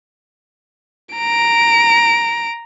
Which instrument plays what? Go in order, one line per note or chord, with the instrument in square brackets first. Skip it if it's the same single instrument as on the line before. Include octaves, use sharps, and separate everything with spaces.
[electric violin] A#5 D7